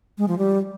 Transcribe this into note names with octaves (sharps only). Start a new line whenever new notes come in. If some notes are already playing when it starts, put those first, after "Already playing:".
G#3
F3
G3